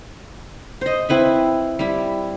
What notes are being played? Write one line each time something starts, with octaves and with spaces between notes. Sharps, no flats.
C5 D#5
C4 E4 B4 E5
G3 E4